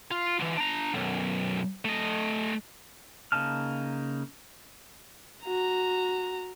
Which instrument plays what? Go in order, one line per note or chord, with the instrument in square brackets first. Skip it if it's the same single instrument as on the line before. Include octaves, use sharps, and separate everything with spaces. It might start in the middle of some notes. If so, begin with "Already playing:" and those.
[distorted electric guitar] F4
D3 E3
D4 A#5
B1 F#2
A3 D#5
[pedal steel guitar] C#3 A#3 D#4 A5 F6
[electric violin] F#4 A#5